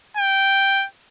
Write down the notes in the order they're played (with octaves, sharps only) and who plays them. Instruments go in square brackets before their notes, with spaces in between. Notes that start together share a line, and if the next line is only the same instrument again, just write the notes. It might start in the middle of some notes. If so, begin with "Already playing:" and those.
[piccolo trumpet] G5